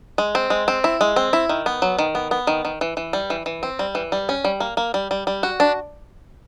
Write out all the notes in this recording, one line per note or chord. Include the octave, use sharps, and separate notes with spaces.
G#3
C4
G#3
C4
E4
G#3
C4
E4
D#3
B3
F#3
D#3
B3
B3
D#3
D#3
E3
E3
G3
E3
E3
C4
G3
E3
G3
C#4
G3
A#3
A#3
G3
G3
G3
F#4
D4